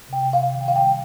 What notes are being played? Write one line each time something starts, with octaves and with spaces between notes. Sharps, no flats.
C3 G5
C3
F5
C3
D#3
G5
D#3 F5
G5
G3